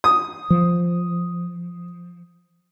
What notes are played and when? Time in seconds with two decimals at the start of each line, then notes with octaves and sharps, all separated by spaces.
0.04 D#6
0.50 F3